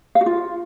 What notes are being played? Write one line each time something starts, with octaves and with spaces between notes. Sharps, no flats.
F5
F#4
F4